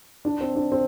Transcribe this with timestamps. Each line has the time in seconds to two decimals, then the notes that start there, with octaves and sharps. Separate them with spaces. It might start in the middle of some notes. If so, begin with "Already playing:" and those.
0.25 D4
0.41 C4
0.56 D4
0.72 C4